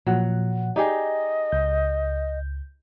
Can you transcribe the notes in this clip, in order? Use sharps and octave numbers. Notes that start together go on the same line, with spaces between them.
A#2 F3 F#3 F#5
D#4 G4 G#4 D5 D#5
C#2 G6